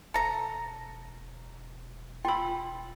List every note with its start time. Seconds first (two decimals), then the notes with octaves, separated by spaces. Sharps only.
0.14 E1 A4 A#5
2.25 F4 G5 B5 E6